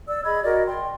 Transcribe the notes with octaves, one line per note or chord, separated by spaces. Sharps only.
D5 E6
G#4 D#5 B5 G#6
F#4 A#4 D5 D#5
G5 C6